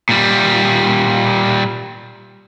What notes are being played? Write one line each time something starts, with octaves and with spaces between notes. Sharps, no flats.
A#2 G3